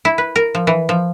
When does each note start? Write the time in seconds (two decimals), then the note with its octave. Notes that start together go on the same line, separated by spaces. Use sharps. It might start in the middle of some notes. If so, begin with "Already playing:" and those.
0.05 E4
0.18 B4
0.36 A#4
0.55 F3
0.67 E3
0.89 F3